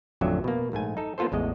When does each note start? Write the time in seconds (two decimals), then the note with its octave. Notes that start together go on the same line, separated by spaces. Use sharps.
0.21 A1 F2 D3 F#3 E5
0.44 B2 A#3
0.72 A#1 G#2 A3 G#5
0.97 D#4 A4
1.18 A#3 B3 F4 A4 C5
1.32 A1 E2 G#3 D#5